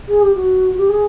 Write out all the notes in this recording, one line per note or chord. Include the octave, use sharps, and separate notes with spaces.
G#4
G4
F#4
G4
G#4